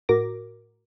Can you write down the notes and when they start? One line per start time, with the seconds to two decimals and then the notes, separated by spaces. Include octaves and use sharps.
0.09 A2 F#4 A#4 D6 A#6